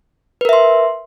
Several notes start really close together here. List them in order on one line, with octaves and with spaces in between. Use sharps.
B4 A#4 E5 C6